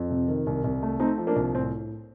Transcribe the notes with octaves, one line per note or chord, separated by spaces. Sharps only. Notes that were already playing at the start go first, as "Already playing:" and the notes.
Already playing: F2
C3
D#3
C2
C2
A3
A3 C4 D#4
F3
A#3 D4
C2
A2 C4